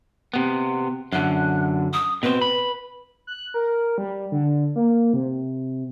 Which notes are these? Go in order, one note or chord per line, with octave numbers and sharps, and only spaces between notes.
C3 B3
F#2 D3 F#6
D#6
B2 C4 B4
B5
F#6
A#4
G3
D3
A#3
C3